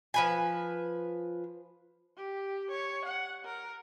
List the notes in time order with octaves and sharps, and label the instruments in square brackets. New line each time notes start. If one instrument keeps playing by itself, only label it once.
[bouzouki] F3 B4 G#5
[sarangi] G4
C#5
F#5
A#4